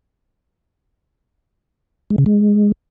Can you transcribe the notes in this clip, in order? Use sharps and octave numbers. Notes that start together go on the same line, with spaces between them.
G#3
C#3
G#3